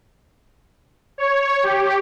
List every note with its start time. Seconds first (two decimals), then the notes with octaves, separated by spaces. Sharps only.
1.18 C#5
1.63 G4